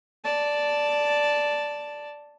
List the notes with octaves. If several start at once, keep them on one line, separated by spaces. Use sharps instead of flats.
D5 A5